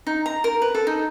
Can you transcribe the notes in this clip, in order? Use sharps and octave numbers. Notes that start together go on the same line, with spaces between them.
D#4
A#5
A#4
B4
A4
D#4